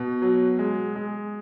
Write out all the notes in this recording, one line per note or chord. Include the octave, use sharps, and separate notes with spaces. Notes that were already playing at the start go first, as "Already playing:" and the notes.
Already playing: B2
F#3
G#3
G#3